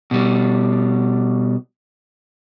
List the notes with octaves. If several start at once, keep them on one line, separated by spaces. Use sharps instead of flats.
B2 G3